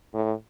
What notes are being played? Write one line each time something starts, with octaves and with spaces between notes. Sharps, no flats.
A2